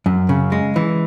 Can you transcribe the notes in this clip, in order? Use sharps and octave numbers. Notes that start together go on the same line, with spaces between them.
F#2
C#3
G#3
E3